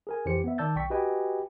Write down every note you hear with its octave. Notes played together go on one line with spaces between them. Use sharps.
G#4 A#4 G#5
F2 E3 G4 C5 C#7
B3 E5
D#3 D5 A5 E6 G6 A6
B1 G5 C#6 B6
F#4 G4 B4 D#5 G5 G#5